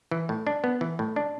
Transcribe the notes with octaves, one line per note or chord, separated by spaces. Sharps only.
E3
A2
D4
B3
E3
A2
D4